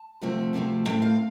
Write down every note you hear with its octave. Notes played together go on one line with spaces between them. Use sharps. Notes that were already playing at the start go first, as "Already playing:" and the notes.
Already playing: A5
D2 C3 F3 A3 C4
D2 C3 F3 A3 C4
A2 A3 C4 G5
F5